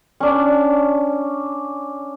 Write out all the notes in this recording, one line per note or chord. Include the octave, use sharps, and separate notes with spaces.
C#4 D4